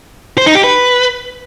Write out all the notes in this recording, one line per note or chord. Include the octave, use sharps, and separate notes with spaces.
C5
D#4
G4
B4